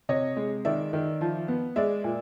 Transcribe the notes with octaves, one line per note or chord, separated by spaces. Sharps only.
C3 C#5 D#5
G#3
D#3 D5 E5
D#3
F3
B3
G#3 D5 E5
A#2